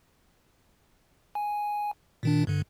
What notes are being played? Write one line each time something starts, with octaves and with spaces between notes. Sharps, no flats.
G#5
A#2 D#3 D4
G2 D3